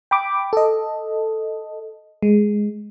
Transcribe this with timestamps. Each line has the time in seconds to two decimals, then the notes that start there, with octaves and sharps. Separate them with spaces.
0.11 G5 B5 D6
0.53 A4 D#5
2.23 G#3